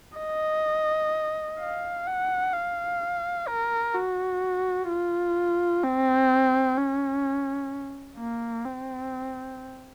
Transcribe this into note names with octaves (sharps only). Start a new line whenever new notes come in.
D#5
F5
F#5
F5
A#4
F#4
F4
C4
C#4
A#3
C4